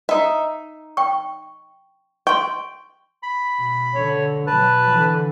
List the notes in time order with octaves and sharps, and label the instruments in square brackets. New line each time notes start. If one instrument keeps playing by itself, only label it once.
[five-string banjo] D#4 E5
[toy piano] G5 C#6
[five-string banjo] G5 [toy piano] C6 C#6
[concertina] B5
[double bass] B2
[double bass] D3 [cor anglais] C#5
[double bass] B2 F#3 [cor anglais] B4 [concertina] A5
[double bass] D3 E3